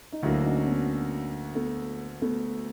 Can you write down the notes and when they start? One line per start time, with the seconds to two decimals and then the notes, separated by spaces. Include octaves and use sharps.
0.12 D#4
0.22 D2 D3 F#3 A#3 D4 E4
0.44 C#4 D#4
0.67 B3 C#4
1.55 A3 B3
2.22 A3 B3